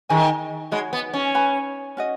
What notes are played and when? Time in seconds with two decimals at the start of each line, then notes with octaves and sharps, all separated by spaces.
0.09 D#3 G#4 D#5 G#5 B5
0.71 G#3 D#4 F#4 C#5 B5
0.93 B3
1.14 C#4
1.35 B4 G#5 B5
1.97 C#4 F#4 D#5